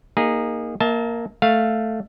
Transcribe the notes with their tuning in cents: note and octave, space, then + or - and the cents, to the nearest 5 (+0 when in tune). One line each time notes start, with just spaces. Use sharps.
A#3 +0 D#4 +0 G#4 -20
A#3 +0 E5 -40 A5 -10
A3 +0 F5 +0